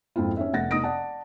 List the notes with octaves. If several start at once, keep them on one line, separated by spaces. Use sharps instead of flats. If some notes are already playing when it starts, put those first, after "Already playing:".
F2 G#2 C4 E4 F4
C#4 D#4 E5
F1 F#5 A6 A#6
F1 D#4 D#6 A#6 D7
D5 F#5 A5